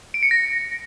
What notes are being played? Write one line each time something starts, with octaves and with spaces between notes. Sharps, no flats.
D7
C#7
A#6